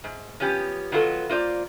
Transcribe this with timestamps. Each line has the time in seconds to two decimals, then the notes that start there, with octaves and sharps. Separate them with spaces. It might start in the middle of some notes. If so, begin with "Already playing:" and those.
0.04 G#2
0.40 F3 B3 C#4 G4
0.92 D#3 F#3 B3 F4 F#4 A4
1.29 A#3 F4 C5 D5